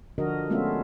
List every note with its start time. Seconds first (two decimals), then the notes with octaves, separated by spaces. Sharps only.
0.18 D3 F3 D4 F#4 A#4 D#5
0.50 G#3 A3 B3 C#4 F4 E5